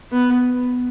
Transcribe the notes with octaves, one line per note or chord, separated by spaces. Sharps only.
B3